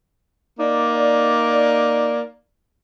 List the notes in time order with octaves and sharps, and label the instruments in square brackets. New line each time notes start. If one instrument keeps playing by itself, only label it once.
[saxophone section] A#3 D#4 D5